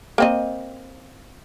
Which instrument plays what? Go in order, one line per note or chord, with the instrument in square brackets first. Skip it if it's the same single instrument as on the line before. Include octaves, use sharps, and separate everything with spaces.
[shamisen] A#3 C4 D#5